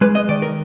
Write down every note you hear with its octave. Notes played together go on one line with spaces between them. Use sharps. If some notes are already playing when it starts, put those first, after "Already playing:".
G#3 B4
D#5
D#3 D5
A#4